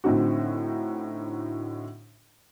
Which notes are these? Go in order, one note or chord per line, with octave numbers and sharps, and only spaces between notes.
A2 D3 C4 D#4 F#4